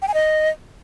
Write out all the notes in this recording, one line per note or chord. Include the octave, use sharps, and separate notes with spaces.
G5
G#5
D#5